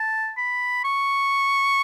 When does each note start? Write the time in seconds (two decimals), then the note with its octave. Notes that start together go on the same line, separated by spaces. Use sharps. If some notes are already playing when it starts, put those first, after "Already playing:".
Already playing: A5
0.37 B5
0.85 C#6